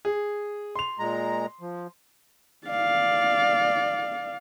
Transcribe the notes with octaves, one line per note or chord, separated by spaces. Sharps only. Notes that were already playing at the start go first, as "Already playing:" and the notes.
G#4
C6 F7
A#2 G#3 A#5
F3
D5 F5